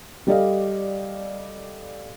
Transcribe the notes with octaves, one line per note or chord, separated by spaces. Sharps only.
G3 G4 A4 D5 D#5 F5